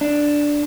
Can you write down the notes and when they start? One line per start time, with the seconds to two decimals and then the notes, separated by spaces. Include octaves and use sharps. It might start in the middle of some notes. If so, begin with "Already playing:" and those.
0.01 D4